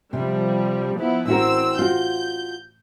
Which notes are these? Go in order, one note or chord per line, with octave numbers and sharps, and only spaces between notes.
C3 F3 G3
F3 B3 E4
A1 C4 E4 F#4 A#4 E6
F4 F#4 G6